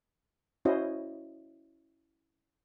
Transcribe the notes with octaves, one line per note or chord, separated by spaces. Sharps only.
C#4 E4 F#4 C5 D#5